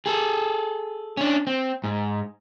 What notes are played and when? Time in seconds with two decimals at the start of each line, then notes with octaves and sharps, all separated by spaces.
0.06 G#4 A4
1.17 C#4 D4
1.47 C4
1.84 G#2